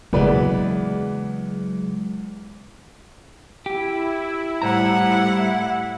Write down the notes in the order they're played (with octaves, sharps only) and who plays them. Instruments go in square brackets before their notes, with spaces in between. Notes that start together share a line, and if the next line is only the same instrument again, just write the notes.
[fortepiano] E2 B4 D5 [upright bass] C#3 A#3 [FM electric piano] F#3 G#3
[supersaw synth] E4 [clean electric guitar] G4
[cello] A2 F#5 [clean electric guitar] G3 C5 A#5